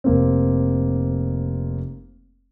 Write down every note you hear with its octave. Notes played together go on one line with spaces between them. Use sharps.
F1 A#3 C4